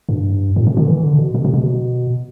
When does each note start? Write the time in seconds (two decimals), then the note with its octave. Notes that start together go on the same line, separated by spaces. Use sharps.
0.09 G2
0.56 A2
0.67 B2
0.77 D3
0.88 E3
1.04 D3
1.18 B2
1.35 B2
1.45 C3
1.54 B2